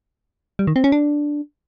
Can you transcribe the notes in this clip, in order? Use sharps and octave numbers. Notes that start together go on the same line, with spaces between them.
G3
D#3
C4
C#4
D4